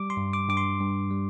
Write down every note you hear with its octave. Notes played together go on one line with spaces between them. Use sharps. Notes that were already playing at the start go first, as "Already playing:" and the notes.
Already playing: G3 D6
C6
G2
D6
G2 D6
C6
G2
G3